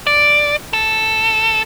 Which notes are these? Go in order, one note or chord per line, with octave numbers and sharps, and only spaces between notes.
D5
A4